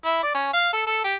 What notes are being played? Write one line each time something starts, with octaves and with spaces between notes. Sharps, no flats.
E4
D5
C#4
F5
A4
A4
G4